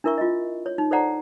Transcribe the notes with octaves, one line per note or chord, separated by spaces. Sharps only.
D4 E4 A#4 E5 C#6
F4 D#5
C#5
D#4
A4 C5 D5 F#5 A#5